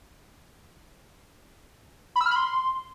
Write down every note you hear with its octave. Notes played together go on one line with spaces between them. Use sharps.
B5
E6
F6
B5
C6